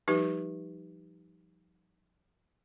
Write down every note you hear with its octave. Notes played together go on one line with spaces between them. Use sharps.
F3 G3 D#4 G4 B4